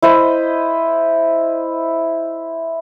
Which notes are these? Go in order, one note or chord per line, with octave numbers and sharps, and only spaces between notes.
E4 C5 D#5